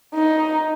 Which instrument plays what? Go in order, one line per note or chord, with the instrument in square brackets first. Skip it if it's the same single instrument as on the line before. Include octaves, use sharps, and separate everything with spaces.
[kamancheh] D#4